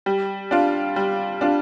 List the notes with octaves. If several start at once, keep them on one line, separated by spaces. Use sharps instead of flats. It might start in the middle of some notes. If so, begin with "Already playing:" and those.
G3
D4 F4
G3
D4 F4